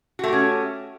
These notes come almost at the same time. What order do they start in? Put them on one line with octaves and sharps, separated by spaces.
F#4 A3 G4 C#4